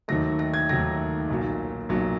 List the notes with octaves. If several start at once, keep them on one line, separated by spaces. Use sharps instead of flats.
D#2 D#3 F#3 A3 A#6
A#6
G#6
D#2 D#3 F#3 A3 A#6
B1 A#2 F#3
B1 A#2 F#3